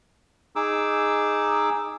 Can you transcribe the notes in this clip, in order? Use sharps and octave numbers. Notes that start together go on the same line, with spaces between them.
D#4 G#4 D6 E6